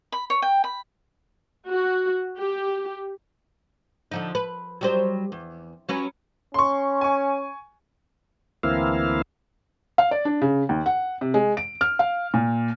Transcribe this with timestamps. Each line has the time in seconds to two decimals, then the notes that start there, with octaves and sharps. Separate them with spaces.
0.12 B5
0.30 C#5
0.42 G5
0.64 B5
1.69 F#4
2.37 G4
4.12 D3 F3 D#4
4.35 B4
4.81 F#3 G3 C5
5.32 E2
5.89 F#3 C#4 B4
6.54 C#4 C6 C#6
7.01 G#5 C#6
8.63 D2 E3 A#3 C4 E4 F5
9.98 F5
10.11 D5
10.25 D4
10.42 C#3
10.69 D#2
10.86 F#5
11.21 C3
11.34 G#3
11.57 D7
11.81 F6
11.99 F5
12.34 A#2